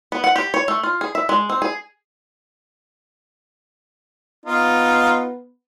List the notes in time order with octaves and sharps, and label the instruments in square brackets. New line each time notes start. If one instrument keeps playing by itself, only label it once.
[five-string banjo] B3
F#5
G4
C#5
A3
F4
G#4
E5
G#3
C4
G#4
[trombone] B3 [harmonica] D#4 F4